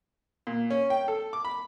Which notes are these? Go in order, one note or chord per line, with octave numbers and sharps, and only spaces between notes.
A#2
C#4
G5
A4
D6
B5